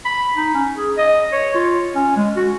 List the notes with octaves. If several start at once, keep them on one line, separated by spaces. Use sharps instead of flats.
B5
D#4
C#4
G#4
D#5
C#5
F4
C#4
G#3
F#4